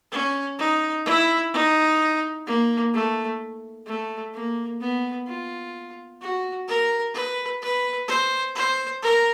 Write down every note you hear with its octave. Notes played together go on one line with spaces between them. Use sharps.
C#4
D#4
E4
D#4
A#3
A3
A3
A#3
B3
F4
F#4
A#4
B4
B4
C5
C5
A#4